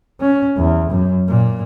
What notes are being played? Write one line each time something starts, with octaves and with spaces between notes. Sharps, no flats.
C#4
E2
F#2
A#2